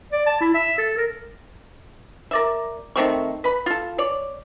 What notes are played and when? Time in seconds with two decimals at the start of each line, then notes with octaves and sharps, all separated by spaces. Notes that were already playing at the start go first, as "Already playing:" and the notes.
0.12 D5
0.26 A5
0.41 E4
0.54 E5
0.78 A4
0.97 A#4
2.31 A#4 D5 E5
2.96 D#3 A3 C4 C#6
3.44 B4 B5
3.66 F4 A4
3.98 C#5 D5